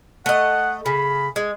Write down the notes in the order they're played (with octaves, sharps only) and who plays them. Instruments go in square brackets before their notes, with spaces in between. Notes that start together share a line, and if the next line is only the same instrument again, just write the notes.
[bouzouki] A3 D#5 [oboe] F#5
[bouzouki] C#3 [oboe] B5
[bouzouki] G#3